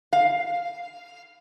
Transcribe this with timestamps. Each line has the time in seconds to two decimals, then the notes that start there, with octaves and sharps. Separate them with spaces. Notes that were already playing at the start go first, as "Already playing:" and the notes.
0.13 F5